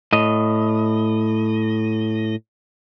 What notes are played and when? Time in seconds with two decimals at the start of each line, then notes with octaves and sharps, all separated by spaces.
0.13 A2 D#5